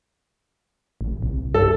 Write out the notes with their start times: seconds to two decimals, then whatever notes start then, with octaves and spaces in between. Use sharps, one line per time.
1.01 A1
1.22 C2
1.54 G2 A4